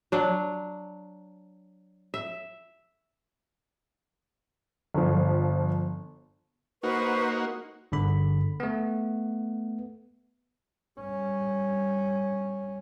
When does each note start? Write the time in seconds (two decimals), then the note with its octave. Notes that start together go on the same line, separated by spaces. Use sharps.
0.12 F#3 D4
2.14 E5
4.94 G1 F3
6.83 A#3 D#4 F#4 B4 C5 C#6
7.92 G1 D3 B5
8.60 A3 B3
11.00 G3 C#4